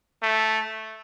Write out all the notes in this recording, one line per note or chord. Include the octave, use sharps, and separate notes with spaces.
A3